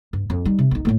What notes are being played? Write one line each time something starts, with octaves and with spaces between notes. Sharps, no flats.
G2
F2
G3 D#4
C3
B1 D#4
D#1 A2